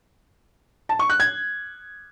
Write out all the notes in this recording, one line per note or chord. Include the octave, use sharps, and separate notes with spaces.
A5
C#6
F#6
G#6